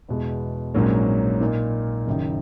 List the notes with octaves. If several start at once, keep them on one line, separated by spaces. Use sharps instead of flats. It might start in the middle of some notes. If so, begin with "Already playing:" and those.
E2 B2 G#3
A#1 G#2 F#3 A#3 C#4
A#2 A#3 D#4
F#1 F#2 D#3